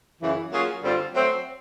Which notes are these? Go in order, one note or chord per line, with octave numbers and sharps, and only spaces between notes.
F#2 C#3 E3
F#3 A#3 C#4 F4 G#4
G2 D3 G3 C4 F4
F#3 A3 C4